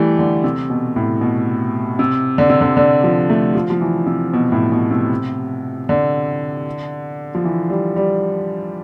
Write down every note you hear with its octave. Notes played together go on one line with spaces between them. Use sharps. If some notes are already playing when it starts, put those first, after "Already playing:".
Already playing: E3 G3 A3 G4
D3
C3
B2
A2
B2
C3
D3
C3
D3
D3
F3
A3
F3
F3
E3
C3
B2
A2
B2
C3
D3
F3
E3
G3
G3